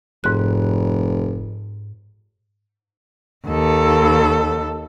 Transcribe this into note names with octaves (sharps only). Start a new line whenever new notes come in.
F1 G#2 F#6
D#2 A4